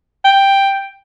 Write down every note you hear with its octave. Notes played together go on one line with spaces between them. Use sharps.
G5